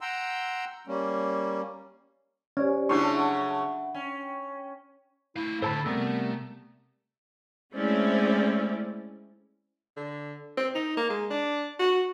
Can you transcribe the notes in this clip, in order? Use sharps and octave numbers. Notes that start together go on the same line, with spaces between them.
F#5 G5 A#5 C6 E6
G3 A#3 C#4
C#4 G4 C5 D5
C#3 F#3 A3 D4 E4 F4 C6 C#6
E5 F#5 B5
C#4 G5
A3 E4 F5
A2 D3 A4 C5 A5 B5
C3 G3 A3 B3 A#4
G#3 A3 C4 C#4 E4 D5
D3
C4
D#4
A#3
G#3
D4
F#4